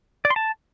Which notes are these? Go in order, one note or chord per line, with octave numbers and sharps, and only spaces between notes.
D5
C6
A5